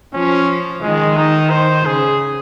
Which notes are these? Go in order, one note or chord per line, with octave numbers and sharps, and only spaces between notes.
F3 C#4
D#3 G#3
D#4
C5
C#3 G#4